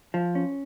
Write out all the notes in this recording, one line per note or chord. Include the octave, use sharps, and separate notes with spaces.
F3
C#4